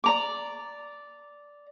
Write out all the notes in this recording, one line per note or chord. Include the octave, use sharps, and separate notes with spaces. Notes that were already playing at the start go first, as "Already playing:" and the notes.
D5 A#5 D6